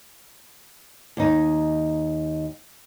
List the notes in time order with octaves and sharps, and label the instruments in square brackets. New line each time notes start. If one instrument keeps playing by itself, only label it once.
[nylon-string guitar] D#2 D#4